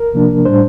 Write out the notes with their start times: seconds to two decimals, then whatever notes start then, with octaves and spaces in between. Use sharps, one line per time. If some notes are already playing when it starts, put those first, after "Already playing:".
Already playing: A#4
0.14 C3 F3 A#3 D4
0.45 A2 G3 D4 C5